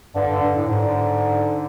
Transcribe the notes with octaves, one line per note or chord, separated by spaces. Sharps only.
G2 D3
G2
G2
A2
G#2 D3